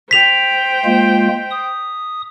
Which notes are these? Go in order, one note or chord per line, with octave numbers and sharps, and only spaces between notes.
C5 G5 B6 F7
G#3 A#3 F4
D#6